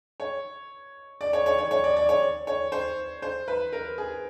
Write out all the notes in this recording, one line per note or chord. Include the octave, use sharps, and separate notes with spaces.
C#5
D5
C#5
C#5
C#5
C#5
D5
D5
C#5
C#5
C5
C5
B4
A#4
G#4